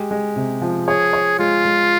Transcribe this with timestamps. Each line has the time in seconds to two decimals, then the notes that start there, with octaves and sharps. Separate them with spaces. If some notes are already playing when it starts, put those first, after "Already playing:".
Already playing: G#3 G4
0.11 G#3
0.36 C3
0.62 F3
0.88 G#4 C#5
1.13 C#5
1.39 G#3 F4
1.65 G#3